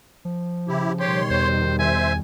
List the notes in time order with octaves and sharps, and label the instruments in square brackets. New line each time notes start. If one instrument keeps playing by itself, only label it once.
[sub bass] F3
[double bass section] C#3 [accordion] E4 G4
[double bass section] B2 D#3 G3 [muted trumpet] G4 [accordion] C#5 C6
[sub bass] E2 [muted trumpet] C5
[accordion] C5 E5 [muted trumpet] G#5